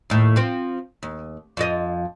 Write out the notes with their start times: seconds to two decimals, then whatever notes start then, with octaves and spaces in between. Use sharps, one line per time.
0.10 D#2 A2
0.36 F3 C4
1.03 D#2
1.57 F2 F3 D#5